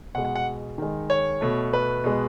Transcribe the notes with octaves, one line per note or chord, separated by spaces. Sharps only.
B2 G#3 F#5
F#5
F#5
D#3 G#3
C#5
B2 A3
B4
B2 G#3